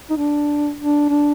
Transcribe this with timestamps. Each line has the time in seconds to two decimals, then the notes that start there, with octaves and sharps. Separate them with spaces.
0.10 D#4
0.17 D4
0.78 D4
1.09 D4